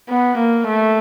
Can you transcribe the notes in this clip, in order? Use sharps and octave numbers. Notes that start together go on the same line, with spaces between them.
B3
A#3
A3